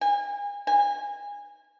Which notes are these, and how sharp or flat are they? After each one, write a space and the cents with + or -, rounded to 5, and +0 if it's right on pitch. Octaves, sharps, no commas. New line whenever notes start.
G#5 -35
G#5 -30